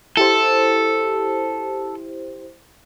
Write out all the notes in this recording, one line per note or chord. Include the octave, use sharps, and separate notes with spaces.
E4 G4 A4 C5